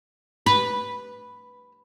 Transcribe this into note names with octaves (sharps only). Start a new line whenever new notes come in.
B4